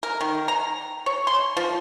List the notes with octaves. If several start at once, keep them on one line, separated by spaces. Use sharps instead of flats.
A#4
D#3
A#5
C#5
C6
F3